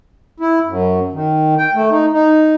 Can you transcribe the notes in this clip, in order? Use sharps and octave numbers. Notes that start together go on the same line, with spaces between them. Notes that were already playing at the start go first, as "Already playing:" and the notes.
E4
F#2
D#3
G5
A3
D#4
D#4